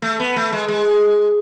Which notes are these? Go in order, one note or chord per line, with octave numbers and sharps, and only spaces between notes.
A3
B3
A3
G#3
G#3